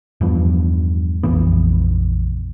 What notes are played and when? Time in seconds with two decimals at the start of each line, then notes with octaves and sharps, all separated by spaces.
0.21 E2 G2 F3 B3
1.23 A#1 F2 E3 B3